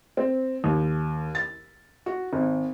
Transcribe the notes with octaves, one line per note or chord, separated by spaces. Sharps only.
C4
D#2
A6
F#4
G#1